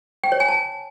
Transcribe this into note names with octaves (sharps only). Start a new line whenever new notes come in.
G5
C#5
G#5
A5